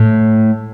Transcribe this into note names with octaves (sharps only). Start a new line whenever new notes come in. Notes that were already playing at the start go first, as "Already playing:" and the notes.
Already playing: A2